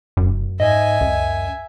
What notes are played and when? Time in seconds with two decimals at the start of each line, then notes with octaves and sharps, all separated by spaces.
0.17 F1 F#2
0.60 G#2 D#5 E5 G#5
1.01 C#2 F#2